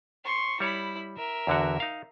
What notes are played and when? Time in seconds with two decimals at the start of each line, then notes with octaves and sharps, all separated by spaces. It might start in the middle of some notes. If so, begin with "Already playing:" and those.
0.25 C6 C#6
0.60 G3 E4 C#5 B5
1.17 A#4 E5
1.47 E2 D3 F#4
1.80 D#4 F5